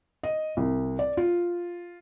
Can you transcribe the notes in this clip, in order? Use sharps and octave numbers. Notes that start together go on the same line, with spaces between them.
D#5
C2
D5
F4